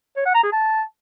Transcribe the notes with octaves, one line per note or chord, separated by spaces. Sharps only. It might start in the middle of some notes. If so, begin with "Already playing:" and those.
C#5
F#5
A#5
G#4
A5